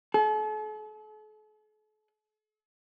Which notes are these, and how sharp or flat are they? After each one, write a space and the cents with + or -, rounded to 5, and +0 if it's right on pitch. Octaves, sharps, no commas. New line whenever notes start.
A4 -45